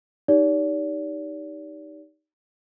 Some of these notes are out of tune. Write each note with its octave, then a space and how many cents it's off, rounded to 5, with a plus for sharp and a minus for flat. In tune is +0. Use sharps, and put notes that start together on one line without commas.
D#4 +0 G4 +0 D5 -40